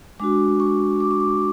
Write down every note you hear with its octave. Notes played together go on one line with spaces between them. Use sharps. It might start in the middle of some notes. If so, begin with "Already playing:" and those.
G#3 D4 F#4 D6
C#6
D6
C#6
D6